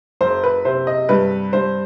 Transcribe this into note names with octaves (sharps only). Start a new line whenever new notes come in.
F#1 C5
B4
C3 C5
D#5
G2 B4
G2 C5